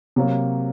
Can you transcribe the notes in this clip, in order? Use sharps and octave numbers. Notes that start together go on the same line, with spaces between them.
C3 F#3 A#3